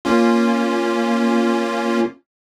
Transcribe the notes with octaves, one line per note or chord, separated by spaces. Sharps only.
A#3 C#4 F4